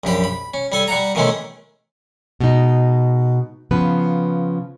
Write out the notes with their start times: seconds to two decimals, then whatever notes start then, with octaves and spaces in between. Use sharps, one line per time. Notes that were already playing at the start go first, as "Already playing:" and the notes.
0.04 A#1 F#2 G4 B5
0.24 B5
0.54 C#4
0.72 G3 A4 G#5
0.88 G3 F#5 A#5
1.15 B2 D#3 E3 G#3 A3 C#4
2.40 B2 G#3 D#4
3.71 C#3 F3 B3 B4